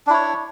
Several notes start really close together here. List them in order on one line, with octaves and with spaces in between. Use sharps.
D4 E4 C#5